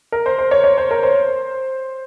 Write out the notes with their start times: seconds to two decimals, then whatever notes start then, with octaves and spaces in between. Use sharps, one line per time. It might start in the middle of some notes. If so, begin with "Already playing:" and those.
0.12 A#4
0.26 C5
0.39 C5
0.51 C#5
0.64 C#5
0.78 C5
0.91 A#4
1.03 C5